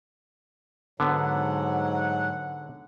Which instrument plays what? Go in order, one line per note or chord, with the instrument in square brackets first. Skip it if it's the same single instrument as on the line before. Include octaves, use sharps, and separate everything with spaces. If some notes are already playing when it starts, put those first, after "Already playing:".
[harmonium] G#2 F#3 [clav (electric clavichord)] D3 B3 [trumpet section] F#5